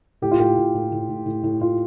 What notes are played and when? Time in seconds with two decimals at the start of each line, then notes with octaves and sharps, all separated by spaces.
0.22 A2 G4
0.31 F4
0.39 A2 G4
0.57 A2
0.74 A2
0.92 A2
1.09 A2
1.26 A2
1.43 A2
1.60 A2 F4